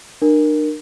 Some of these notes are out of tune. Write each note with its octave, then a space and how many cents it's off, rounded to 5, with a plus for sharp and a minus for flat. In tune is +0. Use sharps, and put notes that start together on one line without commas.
D4 +45 A#4 +5